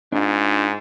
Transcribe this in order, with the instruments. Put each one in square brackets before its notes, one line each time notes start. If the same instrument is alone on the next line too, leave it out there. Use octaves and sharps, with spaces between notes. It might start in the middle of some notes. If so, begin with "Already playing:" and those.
[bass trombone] G#2 [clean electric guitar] D4 F4